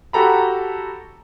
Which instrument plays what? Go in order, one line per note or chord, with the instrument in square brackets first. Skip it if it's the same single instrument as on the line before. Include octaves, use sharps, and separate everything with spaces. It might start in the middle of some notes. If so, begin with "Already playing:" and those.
[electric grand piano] F#4 G4 A4 A#5 B5